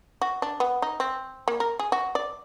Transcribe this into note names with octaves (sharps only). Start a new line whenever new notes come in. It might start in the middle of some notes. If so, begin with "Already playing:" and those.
F#4
D4
B3
D#4
C4
A#3
A#4
G#4
F#4
D5